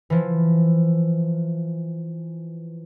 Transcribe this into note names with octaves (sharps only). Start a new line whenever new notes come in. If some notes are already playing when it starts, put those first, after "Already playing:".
E3 F3